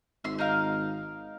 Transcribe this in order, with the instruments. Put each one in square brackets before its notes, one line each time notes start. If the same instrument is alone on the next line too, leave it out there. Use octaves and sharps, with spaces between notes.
[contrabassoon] G#1 [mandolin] E5 C6
[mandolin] D#4 A#4 F5